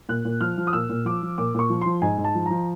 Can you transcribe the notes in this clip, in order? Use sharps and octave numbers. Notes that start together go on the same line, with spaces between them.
A#2 F#6
A#2
F3 F6
F3
D#6
A#2 E6
A#2
F3 D6
F3
A#2 D6
A#2 C#6
F3
F3 C6
G#2 G#5
G#2
A5
F3
F3 A#5